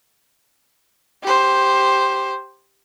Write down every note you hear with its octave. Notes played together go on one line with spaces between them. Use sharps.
G4 C5